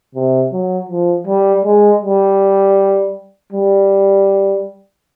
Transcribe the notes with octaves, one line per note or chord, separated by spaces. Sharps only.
C3
F#3
F3
G3
G#3
G3
G3